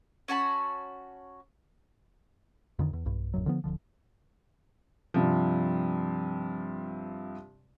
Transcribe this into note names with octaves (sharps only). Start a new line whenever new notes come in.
C#4 F#4 A5 B5
F2 D3 D#3
E2
B1 G2
D1 A#1 F#2 F#3
D3 F3 B3
D1 C2 D3 F3
G2 C3 F3